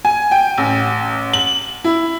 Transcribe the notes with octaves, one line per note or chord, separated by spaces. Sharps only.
G#5
G5
A1
F#7
E4